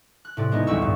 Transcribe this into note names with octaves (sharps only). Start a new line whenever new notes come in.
F#6
A2 C3 D5
G#3 B3 D#4 E4
A1 D2 G3 E5 C#6 E6
G2 A#2